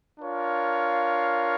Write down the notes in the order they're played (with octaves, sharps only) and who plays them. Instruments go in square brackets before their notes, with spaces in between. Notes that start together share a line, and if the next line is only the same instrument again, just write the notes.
[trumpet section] D4 F4 A#4 C#5 F5